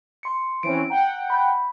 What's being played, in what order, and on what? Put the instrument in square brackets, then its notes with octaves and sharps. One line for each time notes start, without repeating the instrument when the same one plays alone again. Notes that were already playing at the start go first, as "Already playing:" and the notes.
[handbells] C6 C#7
[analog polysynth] E3 C4 C#4 [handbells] D7
[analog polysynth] F#5 G5 [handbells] A#5
[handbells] B5 G6